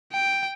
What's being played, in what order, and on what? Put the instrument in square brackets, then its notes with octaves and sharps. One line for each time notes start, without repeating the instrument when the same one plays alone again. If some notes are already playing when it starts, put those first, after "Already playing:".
[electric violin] G5